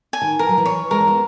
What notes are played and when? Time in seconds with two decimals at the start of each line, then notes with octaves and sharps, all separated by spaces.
0.13 G#5
0.22 D#3
0.39 E3 A#4
0.49 F#3
0.58 E3
0.66 C#5
0.91 E3 G#3 A#4
1.01 C#4
1.07 G#3 B3